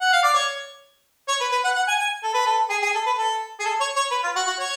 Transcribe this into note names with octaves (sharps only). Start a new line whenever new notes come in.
F#5
F5
D5
C#5
C#5
B4
B4
F#5
F#5
G#5
G#5
A4
B4
A4
G#4
G#4
A4
B4
A4
G#4
A4
C#5
C#5
B4
F4
F#4
F#4
C#5